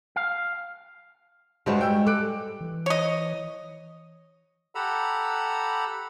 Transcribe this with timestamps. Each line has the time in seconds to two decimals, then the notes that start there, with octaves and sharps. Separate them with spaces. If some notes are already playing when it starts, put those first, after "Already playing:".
0.16 F5
1.66 G2 G3 G#3 F#4 C5
1.81 G5 E6
2.07 A4 D6 F#6 D7
2.61 E3
2.86 C#5 D#5
4.75 G4 A4 F#5 A#5 B5 E6